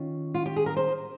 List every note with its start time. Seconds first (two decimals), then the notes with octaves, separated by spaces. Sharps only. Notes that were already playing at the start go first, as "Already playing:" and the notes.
Already playing: D#3 C#4 F4
0.34 F4
0.46 G4
0.56 G#4
0.66 A#4
0.76 C5